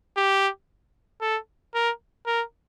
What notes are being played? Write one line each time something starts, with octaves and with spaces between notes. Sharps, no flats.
G4
A4
A#4
A#4